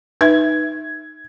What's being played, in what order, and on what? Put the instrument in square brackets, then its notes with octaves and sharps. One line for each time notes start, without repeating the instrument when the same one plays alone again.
[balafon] D#4 B4 E5 [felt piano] G#6